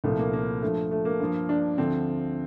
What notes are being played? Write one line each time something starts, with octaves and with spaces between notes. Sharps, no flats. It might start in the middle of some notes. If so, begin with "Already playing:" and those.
C2 A#2 F3 A3
A#3
A#3
G2 F3 A3
A3
A#3
G2 F3
D4
D2 D3 F3 C4